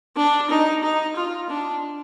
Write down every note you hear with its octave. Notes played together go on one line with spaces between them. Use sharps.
D4
D#4
D#4
F4
D4